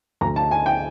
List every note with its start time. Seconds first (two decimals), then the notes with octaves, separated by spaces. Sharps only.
0.21 D2 D3 A#5
0.36 A5
0.51 G#5
0.66 G5